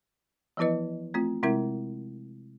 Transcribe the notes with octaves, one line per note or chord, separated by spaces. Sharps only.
E3 F3 B3 E4 B4 D#5
A3 C4 F4
C3 G#3 C4 E4 A#4 E5